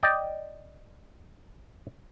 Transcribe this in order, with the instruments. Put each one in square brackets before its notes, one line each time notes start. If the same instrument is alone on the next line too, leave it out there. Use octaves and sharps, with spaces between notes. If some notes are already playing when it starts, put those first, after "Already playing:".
[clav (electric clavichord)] D5 D#5 G5